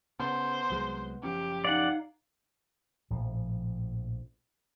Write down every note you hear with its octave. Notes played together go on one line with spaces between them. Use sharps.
C#3 B3 C5
C2 F#3 G#3
F#1 F3 C#4 G4
D#4 D5 F5 F#5
A#1 A2 F3